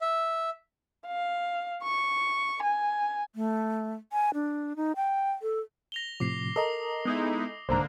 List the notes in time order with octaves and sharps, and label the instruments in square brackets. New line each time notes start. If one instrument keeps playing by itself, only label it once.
[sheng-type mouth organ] E5
[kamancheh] F5
C#6
G#5
[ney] A3
G#5
D4
D#4
G5
A4
[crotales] A#6 F7 G7
[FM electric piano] A2 C3 F3 [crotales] D6 C7
[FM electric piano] A4 D#5 A#5 [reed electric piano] A#4 [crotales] D#6
[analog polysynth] G#3 D#4 E4 [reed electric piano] B3
[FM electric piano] C2 G#2 [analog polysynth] D3 A#3 D4 [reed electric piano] C5 A#5